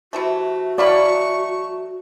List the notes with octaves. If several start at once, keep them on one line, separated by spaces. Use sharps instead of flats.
C3 E3 A3 F#4
E3 F#3 A3 D5 F5 B5 C#6